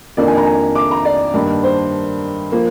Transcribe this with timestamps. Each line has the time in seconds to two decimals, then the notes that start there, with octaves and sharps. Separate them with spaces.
0.17 F2 D#3 A#3 D4 D5
0.28 G#5
0.37 A#5
0.46 G#5
0.75 D6
0.91 A#5
1.05 D5
1.34 G2 D#3 A#3 D4
1.63 C5
2.52 F3 A#3